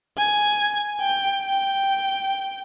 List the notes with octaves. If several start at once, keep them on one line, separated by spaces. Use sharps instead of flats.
G#5
G5
G5